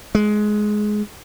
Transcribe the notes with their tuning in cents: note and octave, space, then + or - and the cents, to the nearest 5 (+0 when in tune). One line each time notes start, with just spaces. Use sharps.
G#3 +15